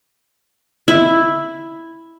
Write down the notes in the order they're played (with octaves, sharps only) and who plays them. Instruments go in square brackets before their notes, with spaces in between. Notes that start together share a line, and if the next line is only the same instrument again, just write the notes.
[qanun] E4